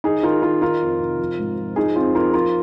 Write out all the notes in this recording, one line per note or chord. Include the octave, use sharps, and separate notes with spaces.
D#3 D#4 G#4
D#3 F4 A#4
D#3 F4 A#4
D#3 F4 A#4
F2
C3
F3
G#2
F3
F3 D#4 G#4
F2 C4 F4
F3 F4 A#4
F3 F4 A#4